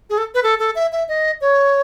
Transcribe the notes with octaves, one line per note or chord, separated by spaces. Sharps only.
G#4
A4
B4
A4
A4
E5
E5
D#5
C#5